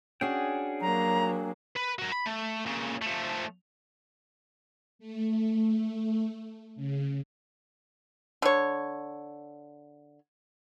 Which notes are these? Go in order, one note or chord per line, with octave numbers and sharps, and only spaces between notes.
C#4 D4 F#4 G#4 G5
F#3 A#3 A#5
B4
F#4 A#4
B5
A3
A#2 C#3
F3 A3
A3
C#3
D3 C#5